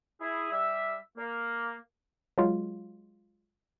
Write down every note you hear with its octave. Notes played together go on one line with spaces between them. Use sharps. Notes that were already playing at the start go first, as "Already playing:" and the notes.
E4 G#4
G3 E5
A#3
F#3 G#3 F4